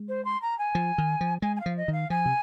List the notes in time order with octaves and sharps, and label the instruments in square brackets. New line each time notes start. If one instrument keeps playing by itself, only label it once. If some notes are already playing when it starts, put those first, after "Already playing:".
Already playing: [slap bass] G#3
[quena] C5
C6
A#5
G#5
[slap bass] F3
D#3
F3
[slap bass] G#3 [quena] G#5
[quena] G#5
F5
[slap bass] F3
[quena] D#5
[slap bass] D#3 [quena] F5
[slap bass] F3 [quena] G#5
[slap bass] C3